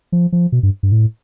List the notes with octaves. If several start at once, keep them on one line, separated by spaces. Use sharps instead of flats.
F3
F3
B2
G2
G2
A2